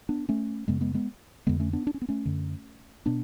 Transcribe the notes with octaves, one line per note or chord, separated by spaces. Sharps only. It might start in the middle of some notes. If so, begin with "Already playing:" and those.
B3 D4
A3 C#4
F#2 C#3 G#3 B3
G#3 B3
G#3 B3
F2 D3 G#3 B3
A3 C#4
B3 D4
D4
C#4
B3
A3 C#4
F#2 D3
B2 B3 D4